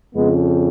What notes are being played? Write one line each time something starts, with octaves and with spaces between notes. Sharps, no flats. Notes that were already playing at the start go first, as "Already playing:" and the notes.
F2 C#3 G#3 B3